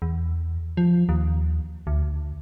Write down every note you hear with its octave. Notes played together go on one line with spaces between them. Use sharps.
E2
F3
D#2
D2